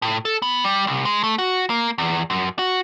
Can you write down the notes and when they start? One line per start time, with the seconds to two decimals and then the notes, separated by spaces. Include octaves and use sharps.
0.02 A2
0.25 A4
0.42 B3
0.64 G3
0.87 C2
1.05 G#3
1.24 A3
1.38 F#4
1.70 A#3
1.98 E2
2.30 F#2
2.59 F#4